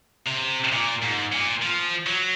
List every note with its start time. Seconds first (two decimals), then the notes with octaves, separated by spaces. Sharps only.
0.27 C3
0.72 A#2
1.02 G#2
1.32 A#2
1.62 F3
2.07 F#3